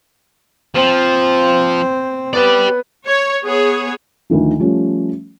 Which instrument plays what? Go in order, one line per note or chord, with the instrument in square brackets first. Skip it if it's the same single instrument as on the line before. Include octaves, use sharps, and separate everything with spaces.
[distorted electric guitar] F3 [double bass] C4
[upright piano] B3 B4 [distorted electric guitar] G4 D5
[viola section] C#5
B3 G#4 C#5
[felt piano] D2 D#3 F3
F3 G3 A3 C#4